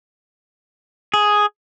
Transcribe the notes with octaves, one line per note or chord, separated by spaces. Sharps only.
G#4